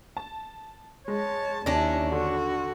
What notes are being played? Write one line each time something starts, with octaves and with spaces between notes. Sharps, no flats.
A5
G#3 C#5 A5
D#2 C#4 D4 E4 A5 A#6
D3 F#4